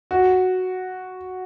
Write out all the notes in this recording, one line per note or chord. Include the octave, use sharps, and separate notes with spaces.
F#4